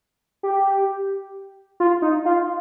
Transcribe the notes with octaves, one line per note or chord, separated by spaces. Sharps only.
G4
F4
D#4
F4